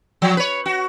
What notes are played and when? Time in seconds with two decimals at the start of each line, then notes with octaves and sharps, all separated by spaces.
0.22 F3
0.37 B4 C#5
0.66 F#4